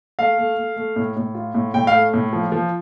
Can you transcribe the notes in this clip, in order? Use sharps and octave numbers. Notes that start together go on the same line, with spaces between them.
A3 F5
A3
A3
A3
A2
A2
F4
A2
A2 G5
F5
A3
A2
F3
F3